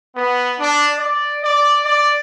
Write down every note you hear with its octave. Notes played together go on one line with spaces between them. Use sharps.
B3
D4
D5
D5
D5